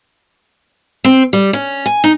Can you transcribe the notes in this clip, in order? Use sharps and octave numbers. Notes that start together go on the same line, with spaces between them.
C4
G3
C#4
G#5
D#4